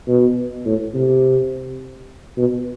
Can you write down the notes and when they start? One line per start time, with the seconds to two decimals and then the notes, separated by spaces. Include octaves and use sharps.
0.08 B2
0.66 A2
0.94 C3
2.37 B2